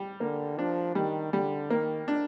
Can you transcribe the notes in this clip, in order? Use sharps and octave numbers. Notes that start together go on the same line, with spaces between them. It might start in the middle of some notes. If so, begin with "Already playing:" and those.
Already playing: G3
D3 A#3
F3 D4
D#3 G3
D3 G3
D#3 A#3
D4